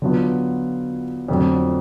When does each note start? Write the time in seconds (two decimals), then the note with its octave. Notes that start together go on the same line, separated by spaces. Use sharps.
0.02 D3 F#3 B3 F4
1.28 F2 D3 F#3 A3